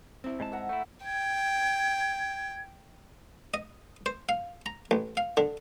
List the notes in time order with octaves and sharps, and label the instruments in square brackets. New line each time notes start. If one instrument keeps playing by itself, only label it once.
[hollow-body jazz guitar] C4 E4
[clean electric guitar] G#2 G#3 A5
[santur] E5 F#5 A#5
[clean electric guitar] A3 E4
[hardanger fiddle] G5 [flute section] G#6
[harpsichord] D#5
C5
F5
A#5
A1
F5
D3